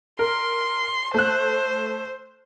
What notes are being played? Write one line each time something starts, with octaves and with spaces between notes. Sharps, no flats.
A#4 C6
A3 C5 F#6